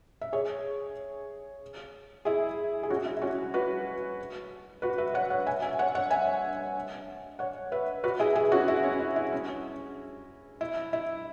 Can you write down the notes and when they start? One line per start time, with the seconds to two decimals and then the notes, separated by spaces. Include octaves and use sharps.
0.22 E5
0.33 G#4 C#5
2.25 E4 G#4
2.83 G#4
2.90 C#4 F#4
3.06 E4
3.17 E4
3.22 C#4 F#4
3.54 F#4 B4
4.82 F#4 B4
4.98 B4 E5
5.14 C#5 F#5
5.30 C#5 F#5
5.46 E5 G#5
5.62 E5 G#5
5.79 C#5 F#5
5.95 C#5 F#5
6.11 E5 G#5
7.39 C#5 F#5
7.72 B4 E5
8.04 F#4 B4
8.19 E4 G#4
8.35 E4 G#4
8.52 C#4 F#4
8.68 E4
8.83 C#4
9.00 E4
9.16 E4
9.32 C#4
10.61 E4
10.93 E4